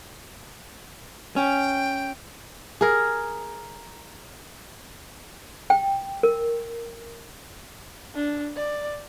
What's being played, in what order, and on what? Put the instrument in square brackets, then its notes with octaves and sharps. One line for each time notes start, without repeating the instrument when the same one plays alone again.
[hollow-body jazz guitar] C#4 [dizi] G5
[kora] G#4 A#4
[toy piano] G5
A#4
[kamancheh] D4
D5